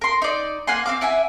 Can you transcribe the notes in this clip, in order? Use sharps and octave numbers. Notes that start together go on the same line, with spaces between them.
A#4 C6
D#4 D5
A#3 F#5 G#5 C6
C4 F5 D6
E4 E5 F#5 G#5